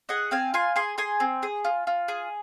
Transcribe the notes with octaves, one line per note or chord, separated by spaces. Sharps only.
G#4 D#5 F#5
C4 F5 G#5
F4 G#5 C6
G#4 G#5 C6
G#4 G#5 C6
C4
G#4
F4
F4
G#4